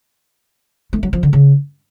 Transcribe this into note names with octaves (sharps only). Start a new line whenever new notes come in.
A3
F#3
F3
D3
C#3